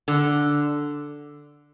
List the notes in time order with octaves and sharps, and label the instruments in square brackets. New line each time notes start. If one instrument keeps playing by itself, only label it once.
[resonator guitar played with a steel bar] D3